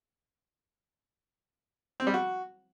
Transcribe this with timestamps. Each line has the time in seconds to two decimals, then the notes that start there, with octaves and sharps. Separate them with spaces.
2.00 C4
2.07 G3
2.14 F#4